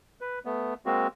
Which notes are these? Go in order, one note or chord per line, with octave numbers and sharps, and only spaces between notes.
B4
A3 B3
G#3 A#3 C4 F#4